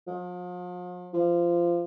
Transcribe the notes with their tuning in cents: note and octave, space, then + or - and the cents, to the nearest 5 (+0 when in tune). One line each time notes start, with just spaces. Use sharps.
F3 +40
F3 -20